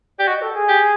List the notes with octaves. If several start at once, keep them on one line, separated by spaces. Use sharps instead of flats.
G4 D5
F#4 D#5
A4
G#4
G4